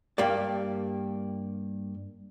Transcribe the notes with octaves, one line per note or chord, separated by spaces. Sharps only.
G2 A#3 G4 D5